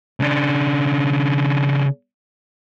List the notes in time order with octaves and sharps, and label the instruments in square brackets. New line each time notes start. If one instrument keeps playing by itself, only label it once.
[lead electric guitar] C#3 D4